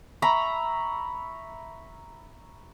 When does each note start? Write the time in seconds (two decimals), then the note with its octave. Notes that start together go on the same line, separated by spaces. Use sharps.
0.22 E5 A#5 B5 C#6